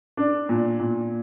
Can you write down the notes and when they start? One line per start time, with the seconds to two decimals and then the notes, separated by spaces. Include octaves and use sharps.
0.17 D4
0.49 A#2
0.80 A#2